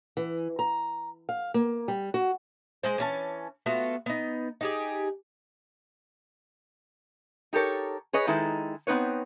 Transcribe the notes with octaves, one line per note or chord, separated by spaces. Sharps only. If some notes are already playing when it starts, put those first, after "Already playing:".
E3
A#5
F5
A#3
G3
F#4
G#3 G#4 C5
E3 C#4 A5
A3 B3 F4 F#4
B3 D#4
D#4 G4 G#4
D#4 G4 A4 A#4 C#5
G#4 B4 C#5 D#5
D#3 G#3 D#4 E4 A4
B3 C4 D#4 B4 C#5